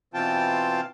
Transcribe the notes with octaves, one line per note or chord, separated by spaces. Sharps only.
B2 E3 C4 F4 G5 A5